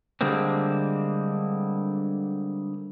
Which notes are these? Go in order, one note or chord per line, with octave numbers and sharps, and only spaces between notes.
D3 G3 G#3 A#3 C4